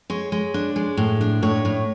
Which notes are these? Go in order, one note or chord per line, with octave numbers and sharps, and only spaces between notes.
G#3 C#5
G#3
D4
G#3
A2
D4
A2 C#5
A2